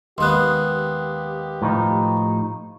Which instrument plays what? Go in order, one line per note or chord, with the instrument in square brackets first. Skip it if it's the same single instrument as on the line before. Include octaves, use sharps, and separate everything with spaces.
[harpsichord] D#2 G#3 B3 [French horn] G4 [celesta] C6 F#6
[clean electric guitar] A2 F3 D#4